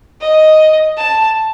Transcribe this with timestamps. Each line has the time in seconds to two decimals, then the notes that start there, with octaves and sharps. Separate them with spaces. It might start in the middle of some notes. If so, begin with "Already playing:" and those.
0.21 D#5
0.97 A5